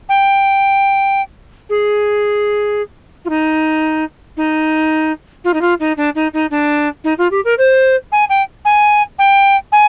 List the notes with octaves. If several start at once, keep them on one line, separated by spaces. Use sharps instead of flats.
G5
G#4
F4
D#4
D#4
F4
D#4
F4
D#4
D4
D#4
D#4
D4
D#4
F4
G4
A#4
C5
G#5
G5
G#5
G5
G#5